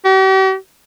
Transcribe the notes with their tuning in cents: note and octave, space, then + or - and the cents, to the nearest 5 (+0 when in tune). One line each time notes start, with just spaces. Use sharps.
G4 -45